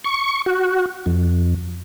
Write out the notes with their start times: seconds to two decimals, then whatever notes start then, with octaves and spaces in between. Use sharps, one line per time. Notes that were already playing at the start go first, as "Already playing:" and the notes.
0.04 C#6
0.46 F#4
1.06 F2